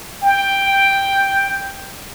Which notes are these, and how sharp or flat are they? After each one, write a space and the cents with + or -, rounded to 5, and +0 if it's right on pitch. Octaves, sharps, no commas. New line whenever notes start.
G5 +5